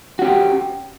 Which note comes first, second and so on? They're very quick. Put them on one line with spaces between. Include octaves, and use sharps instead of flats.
F#4 C#4 G4